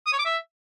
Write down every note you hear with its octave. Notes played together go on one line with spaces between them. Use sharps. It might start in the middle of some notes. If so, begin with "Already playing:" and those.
D#6
C#5
D6
E5